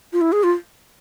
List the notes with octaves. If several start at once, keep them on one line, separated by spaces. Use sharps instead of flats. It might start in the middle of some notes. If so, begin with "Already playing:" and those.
F4
E4
G#4
F4